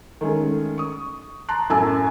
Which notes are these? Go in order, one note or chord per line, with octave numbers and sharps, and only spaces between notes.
D#3 G#3 A3 C#4
C#6 D#6
A5 A#5 C6 F#6
F#2 A2 G#5 A5 E6